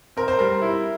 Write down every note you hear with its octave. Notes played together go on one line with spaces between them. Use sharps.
C4 A#4
C5
G3 A#4
E4